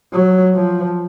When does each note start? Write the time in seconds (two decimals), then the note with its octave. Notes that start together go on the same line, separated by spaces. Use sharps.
0.13 F#3
0.54 F3